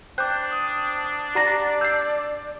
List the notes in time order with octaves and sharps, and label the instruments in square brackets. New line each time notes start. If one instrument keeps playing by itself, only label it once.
[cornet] D4 [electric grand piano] C5 G5 G6 [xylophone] D6 F#6
[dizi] D#6
[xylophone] G4 A#5 A#6 [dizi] D5 [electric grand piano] F#5 C7
[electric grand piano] E6 [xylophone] G6 C7